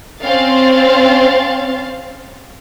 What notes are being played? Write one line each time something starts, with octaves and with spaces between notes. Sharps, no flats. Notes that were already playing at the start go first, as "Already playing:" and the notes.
C4 C#4 C5 F5 A6